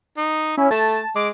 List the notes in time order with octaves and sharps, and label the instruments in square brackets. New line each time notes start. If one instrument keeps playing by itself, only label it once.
[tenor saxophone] D#4
[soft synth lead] C#4 [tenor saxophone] E4
[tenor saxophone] A3 [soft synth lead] A5
[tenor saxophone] G#3 [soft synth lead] D6